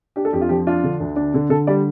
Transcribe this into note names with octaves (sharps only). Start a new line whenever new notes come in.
D4 G4
A4
F2 G4
F4
F3 G4
D4 F4
D3
D2
D4
D3
D3 A4
G3 D5